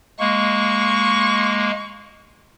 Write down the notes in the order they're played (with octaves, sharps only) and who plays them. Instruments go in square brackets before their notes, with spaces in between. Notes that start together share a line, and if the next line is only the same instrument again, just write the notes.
[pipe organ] G#3 A#3 [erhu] C#6